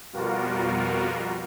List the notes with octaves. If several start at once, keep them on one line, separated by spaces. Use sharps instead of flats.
F2 B2 G3 F4 F#4 A#4